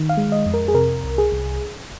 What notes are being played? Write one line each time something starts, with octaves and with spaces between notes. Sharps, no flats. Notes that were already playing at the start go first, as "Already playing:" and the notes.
Already playing: D#3
F5
G#3
D#5
F2
A#4
G#4
C3 A#4
C2
G#4
C2